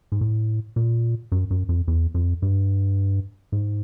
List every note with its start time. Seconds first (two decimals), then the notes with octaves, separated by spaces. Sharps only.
0.12 G#2
0.21 A2
0.76 A#2
1.32 F#2
1.50 F#2
1.69 F2
1.88 E2
2.14 F2
2.42 G2
3.52 G#2